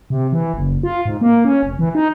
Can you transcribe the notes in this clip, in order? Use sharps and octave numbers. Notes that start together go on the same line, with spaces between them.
C3
E3
F#1
F4
G#2
A#3
C#4
F1
E3
D#4